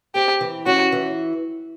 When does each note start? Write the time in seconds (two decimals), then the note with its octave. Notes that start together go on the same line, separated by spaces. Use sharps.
0.15 C4 G4
0.41 E3
0.66 C#4 F#4
0.92 E3